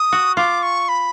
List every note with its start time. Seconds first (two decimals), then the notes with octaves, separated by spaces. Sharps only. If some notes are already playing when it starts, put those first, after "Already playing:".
Already playing: D#6
0.12 F#4
0.37 F4 D6
0.63 C#6
0.89 B5